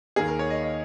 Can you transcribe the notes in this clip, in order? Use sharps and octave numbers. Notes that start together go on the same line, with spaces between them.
D#2 D#3 A#3 G#4
A#4
C#5
D#5
D#5